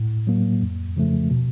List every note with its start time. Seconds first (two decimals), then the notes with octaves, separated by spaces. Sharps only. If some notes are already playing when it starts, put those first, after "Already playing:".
Already playing: A2
0.27 F#3 A#3
0.62 F2
0.96 C#3 F3 A3
1.30 B2